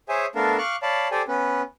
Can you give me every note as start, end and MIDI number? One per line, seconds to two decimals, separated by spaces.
0.09 0.26 68
0.09 0.26 72
0.09 0.26 73
0.09 0.26 76
0.09 0.26 80
0.35 0.57 57
0.35 0.57 59
0.35 0.57 62
0.35 0.57 69
0.35 0.57 70
0.35 0.57 77
0.58 0.76 77
0.58 0.76 85
0.58 0.76 86
0.58 0.76 89
0.58 0.76 90
0.83 1.08 73
0.83 1.08 74
0.83 1.08 77
0.83 1.08 81
0.83 1.08 83
1.11 1.22 67
1.11 1.22 69
1.11 1.22 72
1.11 1.22 74
1.11 1.22 79
1.11 1.22 80
1.28 1.62 59
1.28 1.62 61
1.28 1.62 71